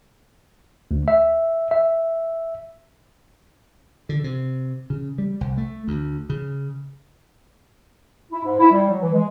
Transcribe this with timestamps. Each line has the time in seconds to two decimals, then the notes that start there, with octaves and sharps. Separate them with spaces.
0.91 D2
1.08 E5
1.71 E5
4.09 D3
4.24 C3
4.90 C#3
5.18 G3
5.41 C2
5.57 A3
5.88 D2
6.29 C#3
8.31 E4
8.44 G#2
8.59 E4
8.71 G3
8.88 F#3
9.00 E3
9.12 G#3